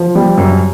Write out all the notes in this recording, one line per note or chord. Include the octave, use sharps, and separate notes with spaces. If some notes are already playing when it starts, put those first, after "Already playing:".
Already playing: F3
G3
F#2